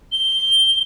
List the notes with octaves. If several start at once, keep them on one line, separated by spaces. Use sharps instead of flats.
G7